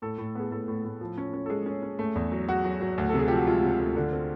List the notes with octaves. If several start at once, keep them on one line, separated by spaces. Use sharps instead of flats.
A2 A4
A2
B3 G#4
A2 A4
A2
A2
F3
C#4
C#4
A4
G#3 G#4
C#4
C#4
A3
E2
F#3
F#3 F#4
F#3
F#3
D2
A4
C3
G#4
F3 G4
F#4
G#3 F4
C3
D2
D3
C4